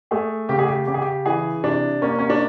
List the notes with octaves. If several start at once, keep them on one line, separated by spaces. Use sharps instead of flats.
A3 G#4
C#3 G4
G#4
G4
C#3 G4
G#4
G4
E3 G#4
C3 D4
A#3 C#4
C#4
D4